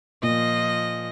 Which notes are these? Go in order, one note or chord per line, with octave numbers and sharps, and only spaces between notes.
A#2 F3 D#5